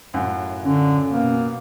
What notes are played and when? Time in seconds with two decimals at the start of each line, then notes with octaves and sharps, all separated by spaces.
0.14 F#2 A2 F4 F#5
0.64 D3 C#4
1.10 B2 A#3